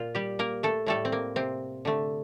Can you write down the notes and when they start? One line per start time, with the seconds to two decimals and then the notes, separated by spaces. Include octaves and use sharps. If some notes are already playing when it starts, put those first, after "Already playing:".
Already playing: A#2 F4
0.15 G3 G4
0.39 A#3 A#4
0.63 A3 A4
0.86 A2 G3 A3 A4
1.05 C4
1.12 A#3
1.36 C3 C4
1.85 D3 A3